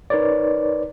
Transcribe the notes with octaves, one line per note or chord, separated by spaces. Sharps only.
D#4 A#4 B4 C#5 D5